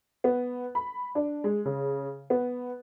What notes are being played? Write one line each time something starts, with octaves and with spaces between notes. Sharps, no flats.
B3
B5
D4
G#3
C#3
B3